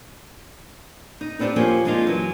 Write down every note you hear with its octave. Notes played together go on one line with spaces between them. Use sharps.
D#4
B3 C4 D4 F#4 G4
F3 A#3 C#4 G4 G#4 C5
G#3 A#3 D4 D#4 F4
F#2 E3